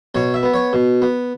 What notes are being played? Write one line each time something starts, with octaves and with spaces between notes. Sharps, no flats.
B2 C#5
E5
B3
C#5
B2
B3